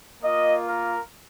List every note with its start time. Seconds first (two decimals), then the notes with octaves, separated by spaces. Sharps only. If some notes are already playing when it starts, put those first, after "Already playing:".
0.22 A#3 F4 D#5
0.68 A#4